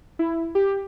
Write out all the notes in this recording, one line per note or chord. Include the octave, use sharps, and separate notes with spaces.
E4
G4